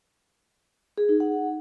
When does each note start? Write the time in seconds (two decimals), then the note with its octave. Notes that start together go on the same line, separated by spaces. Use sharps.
0.98 G#4
1.09 D#4
1.20 F#5